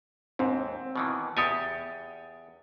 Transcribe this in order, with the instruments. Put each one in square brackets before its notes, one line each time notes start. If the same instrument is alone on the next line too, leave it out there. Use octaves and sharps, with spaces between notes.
[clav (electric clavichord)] D#2 G#2 [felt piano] C4
[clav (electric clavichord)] B2 D#3 E3
[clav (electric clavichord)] E2 G4 G#5 [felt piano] D#6 A6 C#7